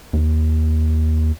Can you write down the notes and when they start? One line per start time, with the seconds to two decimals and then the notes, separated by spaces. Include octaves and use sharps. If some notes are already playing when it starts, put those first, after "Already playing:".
0.13 D#2